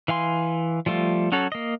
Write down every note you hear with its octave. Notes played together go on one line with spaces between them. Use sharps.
E3 F5 G#5 C6
F3 G3 A3 F4
F#3 C#4 F#4 A4 C#5
A#3 D#5